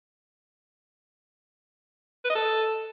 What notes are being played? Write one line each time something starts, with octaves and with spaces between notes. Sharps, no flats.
B4
D#5
A4